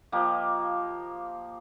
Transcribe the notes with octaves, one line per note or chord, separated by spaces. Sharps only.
F3 A#3 G4 D#5